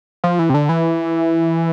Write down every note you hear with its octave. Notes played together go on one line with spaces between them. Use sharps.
F3
E3
C3
D3
E3